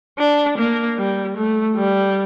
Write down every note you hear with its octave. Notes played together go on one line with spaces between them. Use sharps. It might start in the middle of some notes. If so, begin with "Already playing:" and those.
D4
A#3
G3
A3
G3